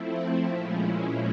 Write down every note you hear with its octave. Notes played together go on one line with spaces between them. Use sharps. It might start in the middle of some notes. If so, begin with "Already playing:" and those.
Already playing: F3 A3 C4 E4
A#2 F3 G#3 C#4 E4